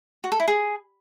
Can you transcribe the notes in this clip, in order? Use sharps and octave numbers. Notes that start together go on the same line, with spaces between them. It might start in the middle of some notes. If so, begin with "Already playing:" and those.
F#4
A4
E4
G#4